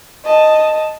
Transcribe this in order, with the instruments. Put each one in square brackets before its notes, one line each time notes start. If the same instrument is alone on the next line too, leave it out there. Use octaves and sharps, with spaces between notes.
[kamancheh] D#5 A5